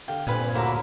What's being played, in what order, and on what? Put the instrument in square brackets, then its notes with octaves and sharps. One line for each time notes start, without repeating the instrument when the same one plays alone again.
[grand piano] D3 F5 [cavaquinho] G4
[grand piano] G2 A#3 C4 [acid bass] A#2 [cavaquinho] B4 F5 G#5
[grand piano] D1 [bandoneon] D3 F#3 A#3 [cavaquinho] E4 B4 A#5